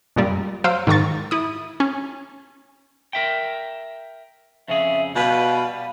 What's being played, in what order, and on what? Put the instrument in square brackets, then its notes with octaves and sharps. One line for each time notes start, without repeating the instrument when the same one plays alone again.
[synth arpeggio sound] F#2 A#2 G3
F#3 C5 F5 E6 D7
G#2 D#3 A#5 C#6 A6
E4 D#6
C#4
[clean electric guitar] A#4 E5 G5
[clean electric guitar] F2 C#3 G#4 [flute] E5
[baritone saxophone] B2 [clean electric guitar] G3 B4 [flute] F5